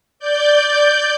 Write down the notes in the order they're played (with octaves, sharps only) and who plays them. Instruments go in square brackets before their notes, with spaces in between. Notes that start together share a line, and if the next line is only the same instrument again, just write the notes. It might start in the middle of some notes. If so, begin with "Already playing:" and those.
[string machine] D5 G6